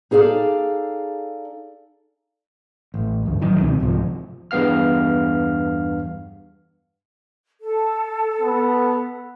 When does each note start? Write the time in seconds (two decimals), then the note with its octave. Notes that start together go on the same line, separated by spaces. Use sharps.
0.11 D#4 G#4 A4 D5 F5
2.94 A1
3.26 D2 G2
3.40 A1 D#3 F#3
3.59 C#2 B2 D#3 C4
3.80 C2 G#2 C3 F3
4.51 E2 G2 B3 F5 F6
7.60 A4
8.42 B3